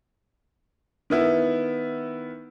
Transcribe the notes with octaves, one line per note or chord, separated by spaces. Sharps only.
D#3 B3 E4